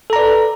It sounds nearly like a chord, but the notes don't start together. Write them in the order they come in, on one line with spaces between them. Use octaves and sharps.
A4 A#5 D5 B4